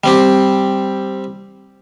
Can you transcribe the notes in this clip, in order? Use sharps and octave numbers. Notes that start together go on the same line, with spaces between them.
G3 C4 G4